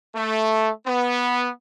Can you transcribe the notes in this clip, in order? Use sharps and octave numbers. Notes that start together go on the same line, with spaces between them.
A3
B3